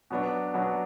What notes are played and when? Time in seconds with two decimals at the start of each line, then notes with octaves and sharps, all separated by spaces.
0.10 B2 F#3 B3 D4
0.54 B2 F#3 B3 D4